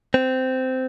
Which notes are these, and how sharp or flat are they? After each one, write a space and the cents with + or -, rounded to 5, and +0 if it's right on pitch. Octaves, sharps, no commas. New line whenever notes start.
C4 -15